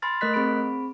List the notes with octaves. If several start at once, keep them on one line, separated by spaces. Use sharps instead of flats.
G#5 B5 C6 F6 A6
A3 A#4 D#5 F#6 B6
C4 G#4 B5 D7